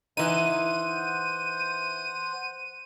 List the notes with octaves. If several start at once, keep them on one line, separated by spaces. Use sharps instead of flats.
E3 D#4 C5 F#5 D#7